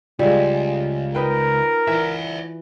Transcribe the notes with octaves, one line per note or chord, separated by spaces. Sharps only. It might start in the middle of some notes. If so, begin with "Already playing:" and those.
C#2 G3 G#3 F4
D#4 A#4 B4 G5
E3 D5 E5